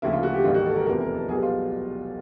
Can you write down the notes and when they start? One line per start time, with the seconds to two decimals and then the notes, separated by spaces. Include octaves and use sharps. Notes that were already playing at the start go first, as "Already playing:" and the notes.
0.02 D2 C#3 F3 A#3 E4
0.13 F4
0.23 F#4
0.34 G4
0.44 A1 G#2 D#3 G3 A#3 F4
0.54 F#4
0.66 A4
0.76 A#4
0.86 F1 E2 C3 F3 A#3 A#4
1.00 A#4
1.14 A4
1.28 B1 B2 G3 G#4
1.42 F4